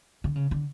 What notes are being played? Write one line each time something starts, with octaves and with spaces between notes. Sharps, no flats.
D3
C#3
D3